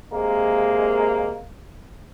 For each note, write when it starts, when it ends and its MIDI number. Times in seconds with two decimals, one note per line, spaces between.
0.13 1.38 48
0.13 1.38 56
0.13 1.38 58